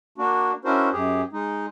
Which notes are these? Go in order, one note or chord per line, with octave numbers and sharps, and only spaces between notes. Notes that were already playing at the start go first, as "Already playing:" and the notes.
A#3 D4 F#4
C#4 D4 E4 F#4 A#4 C5
F#2 G4 G#4
G#3 D#4